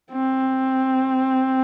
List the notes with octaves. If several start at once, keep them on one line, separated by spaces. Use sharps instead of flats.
C4